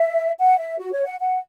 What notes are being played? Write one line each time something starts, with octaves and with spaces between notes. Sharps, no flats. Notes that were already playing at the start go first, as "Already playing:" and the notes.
Already playing: E5
F#5
E5
F#4
C#5
F#5
F#5